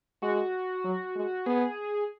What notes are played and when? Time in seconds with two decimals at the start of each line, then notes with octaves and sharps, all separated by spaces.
0.22 G#3 F#4
0.84 F#3
1.16 G#3
1.46 B3 G#4